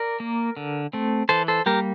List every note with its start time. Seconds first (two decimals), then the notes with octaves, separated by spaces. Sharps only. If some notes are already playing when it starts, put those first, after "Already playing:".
Already playing: A#4 D5
0.20 A#3
0.57 D3
0.93 A3 C4
1.29 E3 A4 C5
1.48 A4 C5
1.66 G3 A#3 G4 A#4